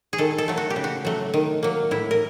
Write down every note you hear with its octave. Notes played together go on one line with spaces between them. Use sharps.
G#4
D#3 A4
A4
F#3 A3
F#4
G4
C#3
F#4
F#3 A3
D#3
F#3 A#3
A2 E4
A#4